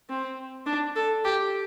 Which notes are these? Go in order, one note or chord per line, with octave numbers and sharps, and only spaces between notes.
C4
D4
A4
G4